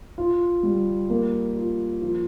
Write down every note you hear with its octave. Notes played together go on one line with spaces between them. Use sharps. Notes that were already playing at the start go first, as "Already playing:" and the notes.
F4
G3
A#3
F4
F3